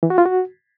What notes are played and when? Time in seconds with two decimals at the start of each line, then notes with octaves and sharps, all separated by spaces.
0.03 E3
0.10 F#4
0.18 F4
0.26 F#4